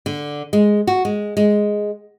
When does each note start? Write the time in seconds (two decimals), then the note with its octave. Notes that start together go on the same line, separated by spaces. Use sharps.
0.06 D3
0.53 G#3
0.87 F#4
1.05 G#3
1.37 G#3